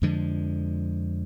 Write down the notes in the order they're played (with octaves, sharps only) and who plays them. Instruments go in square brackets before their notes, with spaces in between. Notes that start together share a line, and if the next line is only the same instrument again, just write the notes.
[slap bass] F2 D3 F3 G#3